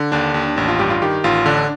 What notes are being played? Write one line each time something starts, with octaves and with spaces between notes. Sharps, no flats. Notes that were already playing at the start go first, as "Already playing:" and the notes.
Already playing: D3
D#2 D4
D#2
A1 D4
F4
G2 G4
F4
D#3 G4
A1 F4
D3 D4